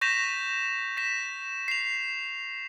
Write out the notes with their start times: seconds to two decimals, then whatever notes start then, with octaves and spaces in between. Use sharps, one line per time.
0.01 C#6 G6 A#6 B6 E7 F7
0.97 A#6 B6 E7
1.68 C7 F7